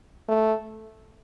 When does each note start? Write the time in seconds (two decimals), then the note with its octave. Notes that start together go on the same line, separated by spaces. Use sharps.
0.28 A3